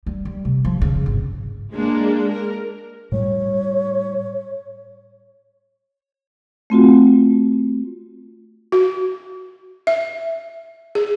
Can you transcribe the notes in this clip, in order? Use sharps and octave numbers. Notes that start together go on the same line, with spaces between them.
G3
G3
C3
F3
C#3
G#1
G#3 A#3 D4
A#4
A2 G3 C#5
A3 C4 F4 F#4
F#4
E5
G#4